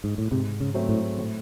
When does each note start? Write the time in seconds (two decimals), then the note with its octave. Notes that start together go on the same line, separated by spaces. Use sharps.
0.04 G#2
0.18 A2
0.31 G#2 C3
0.61 C#3
0.74 F#3 A3 C4
0.89 A2
1.19 A2